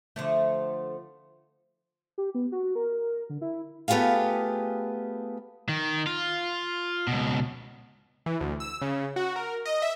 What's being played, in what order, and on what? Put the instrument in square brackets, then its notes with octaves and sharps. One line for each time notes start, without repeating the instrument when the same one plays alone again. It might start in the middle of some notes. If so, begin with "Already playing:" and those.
[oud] D3 F3 A3
[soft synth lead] G4
B3
F#4
A#4
D3
E4
[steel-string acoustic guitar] A3 B3 F4 G4 G#4 F5
[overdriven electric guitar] D#3
F4
C#2 B2
[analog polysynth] E3
D2
E6
C#3
F#4
A#4
D#5
E5